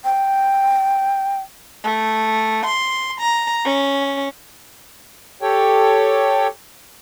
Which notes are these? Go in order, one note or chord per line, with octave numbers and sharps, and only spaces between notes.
G5
A3
C6
A#5
C#4
G4 A4 C#5 G5